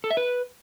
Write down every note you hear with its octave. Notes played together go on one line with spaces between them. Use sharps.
A4
E5
B4